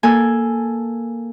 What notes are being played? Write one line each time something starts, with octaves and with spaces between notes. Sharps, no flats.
A#3 A4 G#5